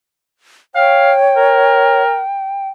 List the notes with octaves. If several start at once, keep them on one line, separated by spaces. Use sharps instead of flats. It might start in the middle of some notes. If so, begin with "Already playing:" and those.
C#5 F5 G5
A#4